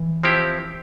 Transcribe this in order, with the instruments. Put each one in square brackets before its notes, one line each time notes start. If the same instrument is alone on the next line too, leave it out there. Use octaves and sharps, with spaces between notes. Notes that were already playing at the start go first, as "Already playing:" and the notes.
Already playing: [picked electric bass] E3
[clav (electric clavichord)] F3 C4 E4 G4